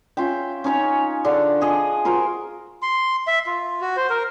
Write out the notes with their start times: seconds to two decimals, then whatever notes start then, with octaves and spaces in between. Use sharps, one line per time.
0.17 C#4 F4 E5 G5
0.64 C#4 D#4 C#5 G#5
1.24 D3 D4 A4
1.61 F3 G#4 D#5
2.05 F4 F#4 A#4 C5
2.82 C6
3.27 E5
3.46 F4
3.81 F#4
3.96 C5
4.10 A#4